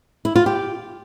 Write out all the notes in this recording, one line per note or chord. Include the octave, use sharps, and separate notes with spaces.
E4
F4
G4